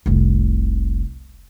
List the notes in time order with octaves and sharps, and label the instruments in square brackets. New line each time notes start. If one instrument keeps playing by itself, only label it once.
[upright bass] F1 C2